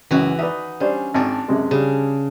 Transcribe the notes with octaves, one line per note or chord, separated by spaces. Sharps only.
C#2 F#2 E3 F#4
D#4 B4 D5 E5
G3 C#4 D4 C5
G#1 D4 D5 G#5
F#2 C3 G#3
C#3 G3 D4